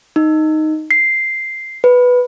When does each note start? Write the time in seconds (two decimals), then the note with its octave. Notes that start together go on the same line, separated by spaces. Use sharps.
0.16 D#4
0.91 C7
1.84 B4